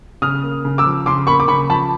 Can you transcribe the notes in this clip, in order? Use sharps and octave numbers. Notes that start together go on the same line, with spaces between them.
C#3 D#6 F6
A#3
C#3
D6 E6
F3
C#3 C6 D6
A#3 B5 C#6
D6
C#3 B5 C#6
F3 A5 B5